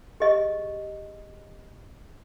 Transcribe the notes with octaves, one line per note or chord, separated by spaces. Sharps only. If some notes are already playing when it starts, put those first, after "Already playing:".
G4 G#4 D#5 C#6